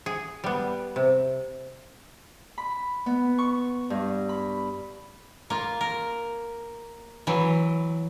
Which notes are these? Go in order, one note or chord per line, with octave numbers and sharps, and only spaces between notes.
G#4
G3 B3
C3
B5
B3
C#6
G2
B5
A#3 F4
A#4
E3 F#3